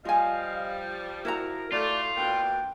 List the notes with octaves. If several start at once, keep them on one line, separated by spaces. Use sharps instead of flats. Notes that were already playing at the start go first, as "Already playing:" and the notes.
F3 G3 F4 D#5 F5 G#5
E4 F#4 A#4 A#5
A3 F4 D5
B2 A#3 D4 G5